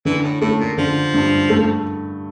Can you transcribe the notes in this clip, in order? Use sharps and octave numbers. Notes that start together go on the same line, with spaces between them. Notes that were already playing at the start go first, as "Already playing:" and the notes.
D3 E3
A2
A2 A3
A#2
D3 F3
G2
A3